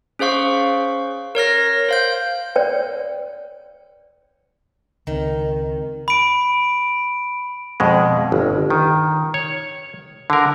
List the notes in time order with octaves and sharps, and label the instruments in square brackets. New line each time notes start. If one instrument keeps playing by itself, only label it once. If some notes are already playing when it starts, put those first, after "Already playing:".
[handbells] C#4 G#4 C5 F5 C#6
A#4 C#5 F6 A#6
C5 F5 G6
[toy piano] C#5 D5 G5
[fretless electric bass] C#2 C4 [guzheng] D#3
[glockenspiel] B5 D7
[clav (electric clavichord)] F2 B2 G#3
G1
D#3
C#5
D3 A#4